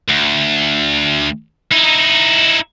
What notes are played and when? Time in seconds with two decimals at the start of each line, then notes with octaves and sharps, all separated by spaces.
0.09 D2
1.72 D#4 E4